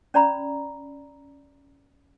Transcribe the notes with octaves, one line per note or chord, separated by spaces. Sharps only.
C#4 D5 A#5 B5